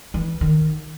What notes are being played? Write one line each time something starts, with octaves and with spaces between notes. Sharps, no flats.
E3
D#3